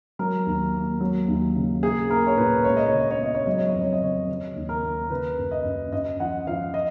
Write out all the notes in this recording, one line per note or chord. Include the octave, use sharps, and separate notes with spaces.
F#3 A#4
D#2
A#3
F#3
D#2
C#3
A#3 G#4
A#3 A#4
C#5
A#2 B4
C#2 C#5
D#5
C#3 C#5
D#5
C#5
B3 D#5
C#5
F#3 D#5
C#5
F2 D#5
C#5
D#5
C#3 C#5
C#3
D#2
A#4
D#2
C#3 B4
F#2
D#5
F#2
F#2 D#5
F3 F#5
F3 F5
D#5